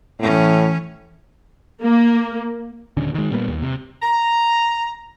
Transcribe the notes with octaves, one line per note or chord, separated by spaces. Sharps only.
A2 E3 C#4
A#3
D#1 D3 C#4
D#3 G#3
A#2 G3 A#3 B3
D#2
C3
A#5